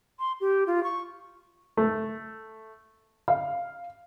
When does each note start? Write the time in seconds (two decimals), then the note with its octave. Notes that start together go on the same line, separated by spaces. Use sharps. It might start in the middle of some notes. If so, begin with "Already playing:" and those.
0.19 C6
0.41 G4
0.67 F4
0.84 C#6
1.77 A3
3.28 F5